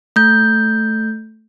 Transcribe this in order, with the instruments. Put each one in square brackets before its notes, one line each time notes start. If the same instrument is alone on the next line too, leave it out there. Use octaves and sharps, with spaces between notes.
[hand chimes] A3 G6